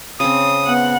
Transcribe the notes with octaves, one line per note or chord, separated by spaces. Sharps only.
C#3 C4 D#6
B3 F#5